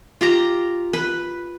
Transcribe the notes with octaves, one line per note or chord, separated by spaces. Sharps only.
F4 G4 A#5
B4